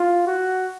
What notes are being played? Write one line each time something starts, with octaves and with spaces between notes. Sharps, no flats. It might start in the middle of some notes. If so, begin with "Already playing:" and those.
Already playing: F4
F#4